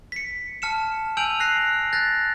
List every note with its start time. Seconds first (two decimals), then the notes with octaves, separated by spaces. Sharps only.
0.12 B6 C#7
0.62 A5 F6 C#7 E7
1.17 G#5 E6 G6 D7 F7 F#7
1.40 F#6 A#6 C7
1.93 F#6 G6 A6 A#6